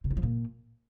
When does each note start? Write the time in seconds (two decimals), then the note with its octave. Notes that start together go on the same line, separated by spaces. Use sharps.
0.04 C3
0.11 D#3
0.17 F3
0.23 A#2